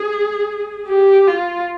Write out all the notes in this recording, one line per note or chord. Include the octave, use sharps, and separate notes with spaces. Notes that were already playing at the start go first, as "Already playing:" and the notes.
Already playing: G#4
G4
F4